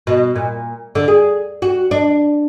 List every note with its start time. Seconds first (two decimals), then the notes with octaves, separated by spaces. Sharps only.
0.07 B2
0.35 A#2
0.95 D3
1.08 G#4
1.62 F#4
1.91 D4